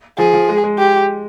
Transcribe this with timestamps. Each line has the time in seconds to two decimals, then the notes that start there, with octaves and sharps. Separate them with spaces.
0.18 F3 G#4
0.34 F3
0.49 G#3
0.64 G#3
0.79 G4